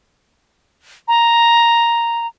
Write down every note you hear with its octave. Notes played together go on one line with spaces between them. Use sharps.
A#5